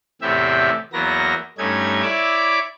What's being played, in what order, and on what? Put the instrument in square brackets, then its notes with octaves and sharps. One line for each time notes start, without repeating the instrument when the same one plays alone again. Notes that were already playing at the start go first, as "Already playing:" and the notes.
[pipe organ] E2 A2 C3 G4 E5
E2 F#3 A#3 B3 A#6
G2 A3 C#4 D#4 G#6
E4 C#5 D5 E5 D6